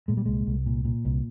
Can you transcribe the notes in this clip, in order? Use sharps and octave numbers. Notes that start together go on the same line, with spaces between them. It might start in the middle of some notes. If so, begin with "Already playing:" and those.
A#2 G#3
G3
C2 G#3
C2
A#2
A#2
C2